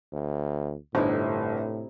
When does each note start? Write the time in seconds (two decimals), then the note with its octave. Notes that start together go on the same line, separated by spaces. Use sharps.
0.13 D2
0.95 G1 A2 C3 D#4 E4